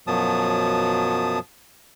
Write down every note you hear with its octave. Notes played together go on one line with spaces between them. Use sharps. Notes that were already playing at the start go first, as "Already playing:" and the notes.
F#2 B2 F3 F#3 A5 D#6